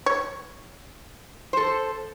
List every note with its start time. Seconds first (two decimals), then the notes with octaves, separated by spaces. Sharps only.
0.06 C#5
1.53 A4 C5